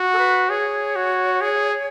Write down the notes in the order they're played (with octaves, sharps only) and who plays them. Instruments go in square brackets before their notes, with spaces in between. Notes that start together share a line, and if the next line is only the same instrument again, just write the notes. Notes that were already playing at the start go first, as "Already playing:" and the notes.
Already playing: [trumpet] F#4
[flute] A4
B4
[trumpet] G#4 [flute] C#5
[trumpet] F#4
G#4